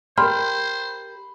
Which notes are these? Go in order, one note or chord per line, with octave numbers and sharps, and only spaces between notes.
G4 A#4 C5 B5 C6 F6